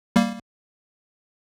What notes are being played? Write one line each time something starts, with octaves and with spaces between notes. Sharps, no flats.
G3 A#3